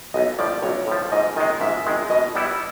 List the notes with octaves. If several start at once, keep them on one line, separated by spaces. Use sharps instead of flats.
B1 D#5
A2 F3 D5
B1 C#5
A2 F3
G#2 D#5
D#3 G#3 D#5
G#2 E5
D#3 G#3
B2 D#5
G3 B3 E4